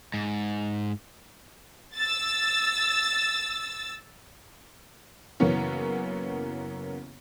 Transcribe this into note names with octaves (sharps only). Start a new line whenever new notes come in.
G#2
E6 A6
F#2 C#3 E3 A#3 B3 C#4